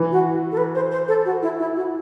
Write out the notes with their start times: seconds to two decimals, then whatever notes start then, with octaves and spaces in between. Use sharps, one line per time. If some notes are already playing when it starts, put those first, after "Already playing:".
Already playing: E3
0.12 F#4
0.52 A4
0.57 B4
0.75 C5
0.92 C5
1.08 A4
1.25 F#4
1.42 E4
1.59 E4
1.76 F#4